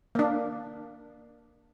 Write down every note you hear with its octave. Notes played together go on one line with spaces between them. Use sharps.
A#3 D4